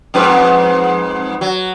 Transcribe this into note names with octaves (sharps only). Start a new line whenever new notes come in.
F2 G#2 B4
F#3